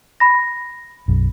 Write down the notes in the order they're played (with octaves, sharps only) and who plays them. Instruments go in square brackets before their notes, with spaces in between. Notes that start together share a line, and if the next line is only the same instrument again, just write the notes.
[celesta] B5 A#6
[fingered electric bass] B1 F#2